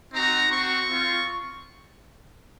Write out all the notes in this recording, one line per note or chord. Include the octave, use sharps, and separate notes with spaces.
C4 D#4 F#4 A#5
C4 F#4 C#6
C4 F4